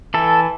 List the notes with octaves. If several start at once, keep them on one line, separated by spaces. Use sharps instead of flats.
E3 A4